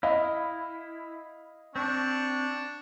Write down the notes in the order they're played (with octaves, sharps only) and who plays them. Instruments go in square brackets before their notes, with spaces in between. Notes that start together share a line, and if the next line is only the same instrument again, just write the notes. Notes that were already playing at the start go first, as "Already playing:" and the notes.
[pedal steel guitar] E4 [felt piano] D#5 F5
[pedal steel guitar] C4 [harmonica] D4 C#6